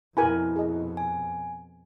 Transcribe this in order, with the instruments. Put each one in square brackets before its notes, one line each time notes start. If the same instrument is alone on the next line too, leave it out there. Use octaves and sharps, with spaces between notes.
[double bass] F2 B2 [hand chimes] E4 [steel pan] A#4 G#5 B5
[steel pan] G#4 D#5
[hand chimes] G#5